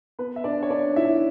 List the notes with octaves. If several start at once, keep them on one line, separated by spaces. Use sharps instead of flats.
B3 B4
E5
D4 D5
C#5
D4 D5
E4 E5